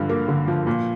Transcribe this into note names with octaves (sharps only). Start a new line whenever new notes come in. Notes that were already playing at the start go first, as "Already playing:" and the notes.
Already playing: G2 D3 F3
A#3
D3
F3
A#2